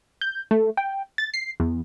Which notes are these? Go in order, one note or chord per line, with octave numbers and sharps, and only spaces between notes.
G6
A3
G5
A6
C7
E2